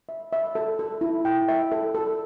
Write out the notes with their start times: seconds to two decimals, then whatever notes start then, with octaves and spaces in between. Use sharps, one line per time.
0.09 E5
0.32 E5
0.55 A4
0.79 A4
1.01 E4
1.25 G5
1.48 E5
1.72 A4
1.95 A4